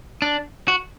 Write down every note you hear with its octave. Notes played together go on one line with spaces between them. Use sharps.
D4
F#4